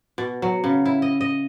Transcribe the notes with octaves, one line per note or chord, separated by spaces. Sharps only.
B2
F#3
C#3
E4
D#5
D#5